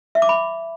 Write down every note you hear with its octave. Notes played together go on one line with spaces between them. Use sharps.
E5
D6
B5